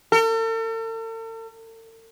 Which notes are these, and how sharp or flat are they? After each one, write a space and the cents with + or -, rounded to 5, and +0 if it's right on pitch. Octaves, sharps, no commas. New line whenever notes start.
A4 +45